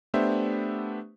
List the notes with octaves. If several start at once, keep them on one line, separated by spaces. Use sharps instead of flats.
A3 B3 D4 G4 C5 E5